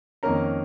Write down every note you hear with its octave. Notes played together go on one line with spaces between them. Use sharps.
F2 D#3 A#3 C#4 A#4 A#5